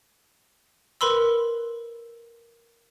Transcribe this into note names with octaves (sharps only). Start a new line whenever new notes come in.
A#4 B4 B5 C6 E6